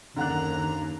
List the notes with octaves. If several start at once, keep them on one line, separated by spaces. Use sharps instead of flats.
F#1 D#2 D3 D4 F#5 A#5 F#6